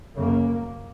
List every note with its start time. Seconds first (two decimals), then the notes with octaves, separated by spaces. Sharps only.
0.15 F#2 C#3 A#3